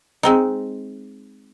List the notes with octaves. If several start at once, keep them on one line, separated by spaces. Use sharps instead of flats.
G#3 C4 D#4